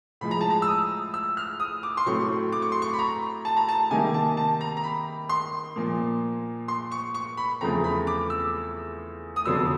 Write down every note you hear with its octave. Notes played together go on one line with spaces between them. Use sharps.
A2 F3 G#3 B5
A#5
A5
A#5
E6
D#6
E6
F6
D#6
D6
C6
A2 F#3 A3 C4 C#6
D6
C#6
C6
C#6
B5
A#5
A5
A#5
A5
C3 D#3 G3 A#3 G#5
A5
A5
A#5
A#5
B5
C6
A#2 F3 A#3
C6
C#6
C#6
B5
E2 C#3 F3 A3 C4 A#5
B5
D6
E6
D#6
F2 D3 F#3 B3 E6